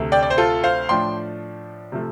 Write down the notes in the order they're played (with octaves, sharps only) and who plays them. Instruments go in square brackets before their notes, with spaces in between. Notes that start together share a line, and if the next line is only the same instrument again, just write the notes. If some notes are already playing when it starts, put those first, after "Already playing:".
Already playing: [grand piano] D2 C3 A3
D5 G5
D5
C5
F4 A4
C5 F5
A2 F3 D4 G5 C6
C3 F3 A3